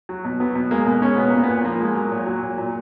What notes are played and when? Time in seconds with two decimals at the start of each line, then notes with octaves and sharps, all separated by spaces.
0.09 F#3
0.25 B2
0.40 F#3 B3
0.55 B2
0.71 G#3 A#3
0.86 B2
1.02 G#3 C#4
1.16 B2 B3
1.30 A#2 A#3
1.43 B3
1.49 A#2
1.64 F3 A#3
1.80 G#3
1.96 F#3
2.12 A#2
2.27 F#3
2.43 A#2
2.58 A#2